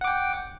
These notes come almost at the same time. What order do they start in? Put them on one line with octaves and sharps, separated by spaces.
F#5 D6 G5